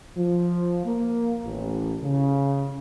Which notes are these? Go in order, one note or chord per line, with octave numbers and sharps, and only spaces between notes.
F3
A#3
A1
C#3